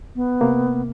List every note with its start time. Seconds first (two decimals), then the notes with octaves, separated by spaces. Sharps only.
0.15 B3
0.41 C3 A#3